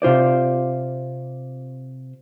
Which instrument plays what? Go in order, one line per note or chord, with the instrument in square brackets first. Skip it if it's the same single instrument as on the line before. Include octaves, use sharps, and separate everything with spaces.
[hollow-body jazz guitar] C3 F4 C5 D5